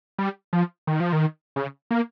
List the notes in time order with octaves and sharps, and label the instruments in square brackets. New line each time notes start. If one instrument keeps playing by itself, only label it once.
[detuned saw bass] G3
F3
D#3
F3
D#3
C#3
A#3